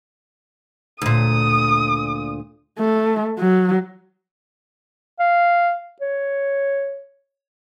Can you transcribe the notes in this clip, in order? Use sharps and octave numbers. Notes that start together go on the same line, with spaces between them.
D2 A#2 D#6
A3
F#3
F5
C#5